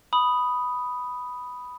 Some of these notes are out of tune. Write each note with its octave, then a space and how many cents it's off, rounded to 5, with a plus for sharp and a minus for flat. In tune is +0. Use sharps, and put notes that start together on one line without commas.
B5 +0 D#6 +0